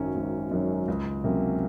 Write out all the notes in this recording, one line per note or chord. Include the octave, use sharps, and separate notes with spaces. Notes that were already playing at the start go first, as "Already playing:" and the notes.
Already playing: G#1 F#2 D#3 F#3 C#4
G#1
F#2 D#3 F#3 C#4
C#2
C3 F#3 A#3 C#4